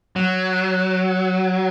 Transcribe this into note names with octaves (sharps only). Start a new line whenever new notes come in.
F#3